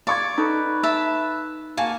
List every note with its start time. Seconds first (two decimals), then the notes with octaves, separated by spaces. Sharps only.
0.07 D5 F5 C#6 G#6
0.38 D#4 A4 B4
0.83 E5 A5 B5
1.77 A#3 F#4 F5 G#5 A5